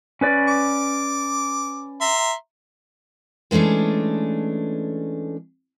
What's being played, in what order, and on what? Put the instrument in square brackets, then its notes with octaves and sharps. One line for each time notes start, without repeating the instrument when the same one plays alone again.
[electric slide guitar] C#4 B4 D5
[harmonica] D6
E5 A#5 C6
[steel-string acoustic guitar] E3 G#3 A3 C#4 D4